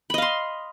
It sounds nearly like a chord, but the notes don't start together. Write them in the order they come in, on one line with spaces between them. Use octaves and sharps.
B5 D#5 F5 C6